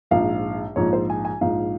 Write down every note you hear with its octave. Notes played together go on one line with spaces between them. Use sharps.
A#1 G#2 F3 F5
A#1 G#2 F3 C#5
C5
G#5
G#5
A#1 G#2 F3 F5